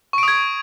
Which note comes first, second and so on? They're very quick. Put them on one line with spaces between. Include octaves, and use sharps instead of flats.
C#6 D7 D#6 G#6